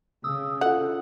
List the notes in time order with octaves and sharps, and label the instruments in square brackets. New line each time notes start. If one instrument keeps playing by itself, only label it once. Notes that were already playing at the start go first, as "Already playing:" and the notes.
[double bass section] C#3 [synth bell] D#6 E6
[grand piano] F4 A4 [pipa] F#5